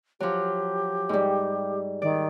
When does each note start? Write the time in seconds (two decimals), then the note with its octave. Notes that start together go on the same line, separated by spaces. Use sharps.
0.20 F3 F#3 G4
1.09 G#2 G3
2.02 D#3 D5